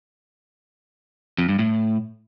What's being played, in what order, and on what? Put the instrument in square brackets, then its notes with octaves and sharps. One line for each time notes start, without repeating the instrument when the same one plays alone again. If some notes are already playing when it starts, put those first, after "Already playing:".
[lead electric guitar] F2
G2
A2